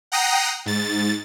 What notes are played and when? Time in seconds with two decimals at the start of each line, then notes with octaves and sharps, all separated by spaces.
0.12 F#5 G5 A#5 D#6 A#6 C7
0.66 G#2 A6